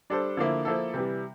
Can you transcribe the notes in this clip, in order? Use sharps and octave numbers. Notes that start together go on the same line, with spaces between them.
G3 D4 A4 C5
D3 F3 A#3 E4
F3 A#3 E4 A4
C3 E3 G3